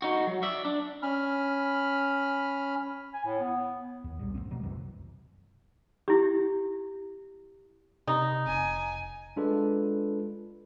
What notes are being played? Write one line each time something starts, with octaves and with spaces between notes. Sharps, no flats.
D#4 F#4
F#3
D5 E5
D4
C#4 B5 F6
G#5
A2
B3
D#2
B1 A#2 G3
G#1 F2 A3 C4
D#2 B2 F#3 G3
C2 F#2 C3 E3
E4 G4
C3 D#4 A#5
F1 G#5
G#3 D4 F4 A4 B4